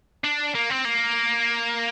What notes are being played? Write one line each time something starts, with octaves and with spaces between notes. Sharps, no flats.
D4
A#3
C4
A#3